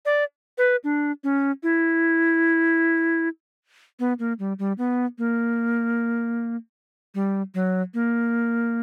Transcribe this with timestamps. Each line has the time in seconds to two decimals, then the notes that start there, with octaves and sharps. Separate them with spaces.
0.06 D5
0.58 B4
0.84 D4
1.24 C#4
1.63 E4
3.99 B3
4.19 A#3
4.39 G3
4.59 G3
4.78 B3
5.18 A#3
7.15 G3
7.54 F#3
7.94 A#3